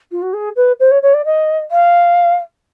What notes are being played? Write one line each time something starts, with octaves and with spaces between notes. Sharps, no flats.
F4
F#4
G#4
B4
C5
C#5
C#5
D5
D#5
F5